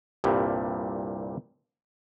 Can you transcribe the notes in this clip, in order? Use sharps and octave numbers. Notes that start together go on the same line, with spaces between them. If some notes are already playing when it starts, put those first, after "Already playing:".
C2 G2 A#2 G3